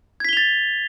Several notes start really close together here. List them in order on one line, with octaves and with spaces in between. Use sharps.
G#6 B6 G7 F7 A6